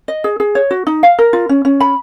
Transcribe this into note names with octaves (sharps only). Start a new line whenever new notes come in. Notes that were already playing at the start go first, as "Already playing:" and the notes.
D#5
G#4
G#4
C#5
F#4
D#4
F5
A#4
F4
C#4
C#4
B5